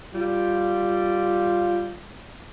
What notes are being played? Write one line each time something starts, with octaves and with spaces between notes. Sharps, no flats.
G3 F4